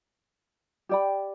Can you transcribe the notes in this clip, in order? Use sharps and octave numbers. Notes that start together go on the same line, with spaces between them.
G4 D5 G5 B5